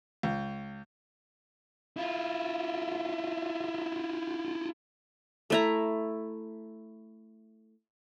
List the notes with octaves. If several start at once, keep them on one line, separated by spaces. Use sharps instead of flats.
C#2
E4 F4
A3 E4 A#5